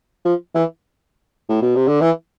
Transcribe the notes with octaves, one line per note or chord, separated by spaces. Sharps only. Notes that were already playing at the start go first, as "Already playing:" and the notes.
F3
E3
A2
B2
C3
D3
E3